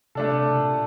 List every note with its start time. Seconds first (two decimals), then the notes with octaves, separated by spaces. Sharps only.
0.15 C3 A3 D4 A4
0.51 C3
0.60 A#2